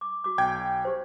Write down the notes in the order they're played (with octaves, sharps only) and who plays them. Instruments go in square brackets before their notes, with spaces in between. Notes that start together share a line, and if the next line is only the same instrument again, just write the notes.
[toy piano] D6
F#4 D6
[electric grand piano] B1 G5 G#6
[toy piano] G4 C5